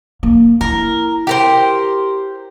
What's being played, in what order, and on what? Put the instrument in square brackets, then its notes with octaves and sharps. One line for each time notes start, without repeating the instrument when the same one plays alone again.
[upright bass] A#3
[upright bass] E4 [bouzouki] A#4
[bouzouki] G4 A#4 C5